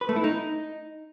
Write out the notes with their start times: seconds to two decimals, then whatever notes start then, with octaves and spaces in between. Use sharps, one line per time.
0.01 B4
0.09 A3
0.16 E4
0.24 D#4